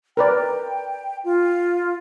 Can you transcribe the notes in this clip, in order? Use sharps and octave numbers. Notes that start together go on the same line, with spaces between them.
A#4 B4 D5 G5
F4